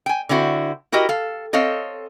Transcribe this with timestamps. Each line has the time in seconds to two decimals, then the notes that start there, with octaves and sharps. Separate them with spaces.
0.06 G5 G#5
0.29 D3 C4 E4 F#4
0.92 E4 F#4 G4 A#4 D#5
1.09 A4 F5
1.53 C4 A4 C#5 D#5 F5